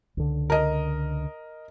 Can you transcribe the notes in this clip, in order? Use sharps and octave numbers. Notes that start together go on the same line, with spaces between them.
C#2 D3
A#4 D#5